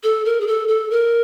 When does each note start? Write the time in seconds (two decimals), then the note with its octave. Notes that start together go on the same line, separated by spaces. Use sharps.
0.04 A4
0.25 A#4
0.41 G#4
0.47 A4
0.68 A4
0.91 A#4